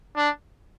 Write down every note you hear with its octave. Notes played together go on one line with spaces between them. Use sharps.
D4